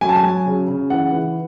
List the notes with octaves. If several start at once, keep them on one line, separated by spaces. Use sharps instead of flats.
F#3 G#5
A5
G#5
F#3
C#3
C#3
E3 F#5
E3